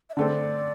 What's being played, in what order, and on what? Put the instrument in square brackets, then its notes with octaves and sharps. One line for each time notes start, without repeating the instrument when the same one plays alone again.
[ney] E5
[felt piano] D3 A3 C4 [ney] D5